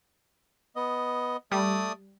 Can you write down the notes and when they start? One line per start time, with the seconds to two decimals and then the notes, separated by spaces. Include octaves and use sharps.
0.76 B3 D#5
1.52 G3 A3 D5 D#6